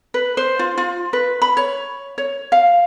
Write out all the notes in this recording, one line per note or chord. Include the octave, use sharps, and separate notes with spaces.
B4
C5
F4
F4
B4
B5
C#5
C#5
F5